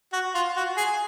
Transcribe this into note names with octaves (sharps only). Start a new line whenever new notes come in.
F#4
F4
F#4
G#4